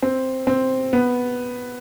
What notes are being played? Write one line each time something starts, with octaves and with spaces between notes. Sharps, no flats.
C4
C4
B3